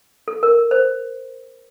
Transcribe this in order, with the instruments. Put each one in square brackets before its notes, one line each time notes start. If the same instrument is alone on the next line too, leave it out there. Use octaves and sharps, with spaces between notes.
[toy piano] A4
A#4
C5